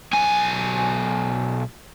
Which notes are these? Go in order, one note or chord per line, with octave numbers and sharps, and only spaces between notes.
B1 G#5